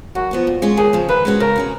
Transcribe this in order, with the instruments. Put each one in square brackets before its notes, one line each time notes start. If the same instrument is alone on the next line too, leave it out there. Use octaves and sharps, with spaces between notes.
[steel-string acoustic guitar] F#2 [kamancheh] F#4
[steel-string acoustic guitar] F3 B3 F#4
A#2
G#3 C#4 F4
[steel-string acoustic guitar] D#2 [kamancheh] G#4
[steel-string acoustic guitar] C#3 F3
[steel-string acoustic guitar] D#3 [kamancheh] B4
[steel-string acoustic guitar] G#3 C#4 F#4
[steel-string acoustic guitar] C#3 [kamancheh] A#4
[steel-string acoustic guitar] G#3 C#4 F#4